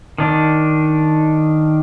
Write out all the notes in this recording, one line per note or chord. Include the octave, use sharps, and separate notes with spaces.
D#3 D4